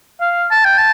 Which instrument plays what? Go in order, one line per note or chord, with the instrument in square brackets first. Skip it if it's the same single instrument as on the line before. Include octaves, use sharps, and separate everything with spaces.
[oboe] F5
A5
G5
A5